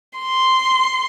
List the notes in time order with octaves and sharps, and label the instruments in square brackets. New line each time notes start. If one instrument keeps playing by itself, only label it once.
[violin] C6